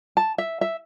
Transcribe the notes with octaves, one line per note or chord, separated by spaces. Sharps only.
A5
E5
E5